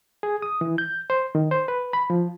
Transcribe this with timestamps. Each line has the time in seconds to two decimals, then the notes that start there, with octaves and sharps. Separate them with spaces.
0.23 G#4
0.42 D#6
0.61 E3
0.78 G6
1.10 C5
1.35 D#3
1.51 C5
1.68 B4
1.93 B5
2.10 F3